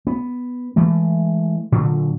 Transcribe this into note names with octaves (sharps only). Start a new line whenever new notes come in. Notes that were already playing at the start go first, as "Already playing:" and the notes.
B3
E3 G#3 A3
A#2 D3 F#3